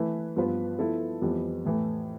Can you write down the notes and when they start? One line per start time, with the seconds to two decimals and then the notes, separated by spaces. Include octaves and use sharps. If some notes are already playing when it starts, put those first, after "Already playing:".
Already playing: E3 A3 E4 B4
0.36 G2 F3 B3 F4 B4
0.79 F3 B3 E4 A4
1.22 F2 E3 G3 B3
1.65 A2 E3 A3